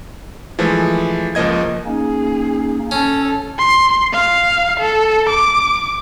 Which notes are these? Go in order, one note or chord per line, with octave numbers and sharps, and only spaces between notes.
E3 F3 G#3 A3
C#2 F3 A#3 D#5 G#6
A#3 C#4 D#4 G#4
C#4 A4 C#5
C6
F5
A4
D6